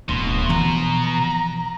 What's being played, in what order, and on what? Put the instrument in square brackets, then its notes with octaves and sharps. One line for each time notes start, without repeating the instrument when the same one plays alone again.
[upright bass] D1 [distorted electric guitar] B2 [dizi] C6
[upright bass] E3 F3 [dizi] A#5